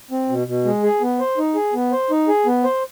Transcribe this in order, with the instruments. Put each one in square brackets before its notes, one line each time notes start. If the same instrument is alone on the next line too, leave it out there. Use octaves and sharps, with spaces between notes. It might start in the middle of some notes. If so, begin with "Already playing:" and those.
[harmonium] C4
B2
B2
G#3
G#4
B3
C5
D#4
G#4
B3
C5
D#4
G#4
B3
C5